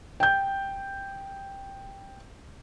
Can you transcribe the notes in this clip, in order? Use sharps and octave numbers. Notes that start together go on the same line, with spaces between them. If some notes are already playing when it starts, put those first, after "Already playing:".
G5 G6